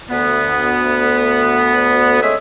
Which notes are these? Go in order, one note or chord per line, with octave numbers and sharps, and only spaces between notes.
D2 B3
G#3 A3 C#4 G#4 E5